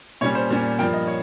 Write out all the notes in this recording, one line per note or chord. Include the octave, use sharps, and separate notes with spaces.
A#2 G3 C#4 C#5
C5
A#2 G3 C#4
G2 F3 A#3 G5
D#5
C#5